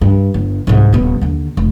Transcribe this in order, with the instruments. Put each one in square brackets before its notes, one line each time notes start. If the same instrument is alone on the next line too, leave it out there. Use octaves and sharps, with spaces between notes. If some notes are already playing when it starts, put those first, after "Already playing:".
[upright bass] G2
G1
C2 G#2
D#1 B3
D#2 D3
F1